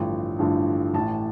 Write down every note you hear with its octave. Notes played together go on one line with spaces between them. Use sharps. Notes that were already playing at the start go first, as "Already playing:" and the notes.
Already playing: A1 G2 D3 F3 G5
A1 G2 D3 F3
A1 A2 E3 A5